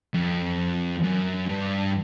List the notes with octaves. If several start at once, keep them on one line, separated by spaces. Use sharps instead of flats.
F2
F#2
G2